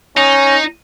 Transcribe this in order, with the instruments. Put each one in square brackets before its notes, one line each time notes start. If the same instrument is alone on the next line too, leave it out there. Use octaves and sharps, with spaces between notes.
[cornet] C#4 [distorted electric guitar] D#4